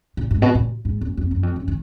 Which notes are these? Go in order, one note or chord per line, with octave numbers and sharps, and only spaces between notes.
A#2
G#2
B2
A#2
G#2
F#2
F2
F#2
F2
F#2
D#3